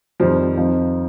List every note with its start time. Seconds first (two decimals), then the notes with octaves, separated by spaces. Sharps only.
0.20 F2 D#3 F3 G3 C4
0.57 F2 F3 C4 D#4